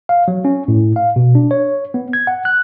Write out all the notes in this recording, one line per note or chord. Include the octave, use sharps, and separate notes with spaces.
F5
F#3
C#4
A2
F5
B2
D4
C#5
B3
G#6
F#5
F#6